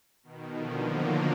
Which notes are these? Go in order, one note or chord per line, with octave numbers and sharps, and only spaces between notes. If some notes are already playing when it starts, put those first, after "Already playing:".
B2 D#3
D3 F3
F#3 A#3